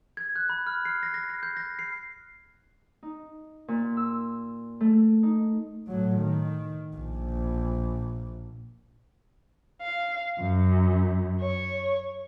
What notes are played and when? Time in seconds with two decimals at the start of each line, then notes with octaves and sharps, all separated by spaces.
0.17 G#6
0.36 F#6
0.49 B5
0.67 F6
0.85 C7
1.03 A#6
1.14 A#6
1.30 C7
1.43 G6
1.57 A#6
1.79 C7
3.03 D#4
3.68 A#2
3.97 E6
4.81 A3
5.23 D#4
5.88 A2 F#3
6.16 D#3
6.96 A#1
9.81 F5
10.41 F#2
11.40 C#5